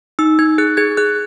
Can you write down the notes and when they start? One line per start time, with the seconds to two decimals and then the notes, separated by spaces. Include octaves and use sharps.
0.19 D#4 E6
0.39 D#4 G#6
0.58 G#4 F#6
0.77 G#4 G#6
0.97 G#4 F#6